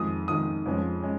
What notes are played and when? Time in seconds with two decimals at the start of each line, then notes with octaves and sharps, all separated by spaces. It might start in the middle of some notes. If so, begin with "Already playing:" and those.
Already playing: F2 D#3 G#3 D#6
0.28 F2 D#3 G#3 D#6
0.66 F2 F3 G#3 C#4
1.02 G#3 C#4